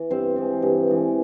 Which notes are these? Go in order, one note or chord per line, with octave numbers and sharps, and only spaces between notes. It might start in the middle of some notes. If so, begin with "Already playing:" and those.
Already playing: E3
G2 C4 C5
E3 G#3
G2
E3 G#3